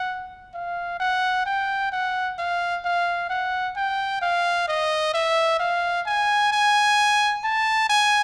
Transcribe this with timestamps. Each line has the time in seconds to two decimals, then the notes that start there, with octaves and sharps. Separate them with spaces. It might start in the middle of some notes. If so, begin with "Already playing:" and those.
Already playing: F#5
0.54 F5
1.00 F#5
1.46 G5
1.92 F#5
2.38 F5
2.85 F5
3.30 F#5
3.76 G5
4.22 F5
4.68 D#5
5.14 E5
5.60 F5
6.06 G#5
6.52 G#5
7.44 A5
7.89 G#5